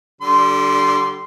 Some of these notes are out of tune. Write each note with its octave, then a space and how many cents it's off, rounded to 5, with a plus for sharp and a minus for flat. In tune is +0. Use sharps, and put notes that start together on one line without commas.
D3 +0 G3 -25 C6 -5